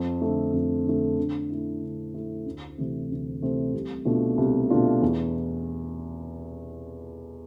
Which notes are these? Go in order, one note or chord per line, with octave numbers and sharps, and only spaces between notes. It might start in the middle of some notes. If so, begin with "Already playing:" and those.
Already playing: F2
D3 A3
F2
D3 A3
D3
A3 E4
D3
A3 E4
D2
C3 E3 A3 C4
D2
C3 E3 A3 C4
C2
B2 A3 D4 F4
C2
B2 A3 D4 F4
E2